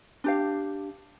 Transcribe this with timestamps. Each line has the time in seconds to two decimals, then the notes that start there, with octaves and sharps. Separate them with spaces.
0.24 D4 G4 F5